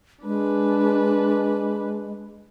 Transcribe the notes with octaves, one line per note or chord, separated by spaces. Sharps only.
G#3 D4 B4